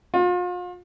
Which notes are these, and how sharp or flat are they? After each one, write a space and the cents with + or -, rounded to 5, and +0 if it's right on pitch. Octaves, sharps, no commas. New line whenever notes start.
F4 +40